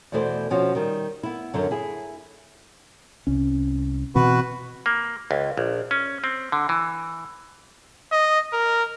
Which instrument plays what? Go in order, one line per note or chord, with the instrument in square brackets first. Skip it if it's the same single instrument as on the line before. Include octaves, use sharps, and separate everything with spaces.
[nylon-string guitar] E2 B2 E3 A3 C5 D5
B2 F3 C#4 F#4
D#3 G3
B3 E4
F#2 D3 F#3
E4 G#4
[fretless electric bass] C2 C#4
[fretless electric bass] B2 E3 C4 [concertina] F#4 B4
[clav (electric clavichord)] A#3
C#2
A#1
C#4
C4
D3
E3
[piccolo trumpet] D#5
A#4